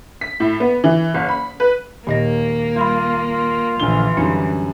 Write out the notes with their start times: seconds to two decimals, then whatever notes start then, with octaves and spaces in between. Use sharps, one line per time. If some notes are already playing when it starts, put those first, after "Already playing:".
0.21 B6
0.40 A2
0.60 B3
0.84 E3
1.14 F#1
1.29 B5
1.60 B4
2.07 D#2 A#2 A#3 D#5 A#6
2.76 G3 F4 B5
3.31 F4
3.80 A#1 D3 E3 G7
4.17 F#2 D3 G3 C#4 D#4